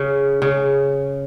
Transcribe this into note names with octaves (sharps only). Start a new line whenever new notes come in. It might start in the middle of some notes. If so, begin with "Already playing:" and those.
Already playing: C#3
C#3